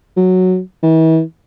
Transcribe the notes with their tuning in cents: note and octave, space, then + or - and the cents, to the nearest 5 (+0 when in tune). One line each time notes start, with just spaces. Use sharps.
F#3 -5
E3 -40